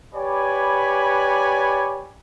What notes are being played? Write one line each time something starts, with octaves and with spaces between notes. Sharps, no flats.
G4 B4 C#5 D5 G#5 B5